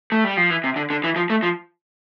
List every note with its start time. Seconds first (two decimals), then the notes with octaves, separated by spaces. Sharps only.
0.12 A3
0.24 G3
0.37 F3
0.50 E3
0.64 C3
0.76 D3
0.90 D3
1.04 E3
1.16 F3
1.30 A3
1.43 F3